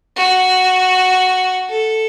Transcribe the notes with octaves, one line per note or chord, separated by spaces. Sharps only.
F#4
A4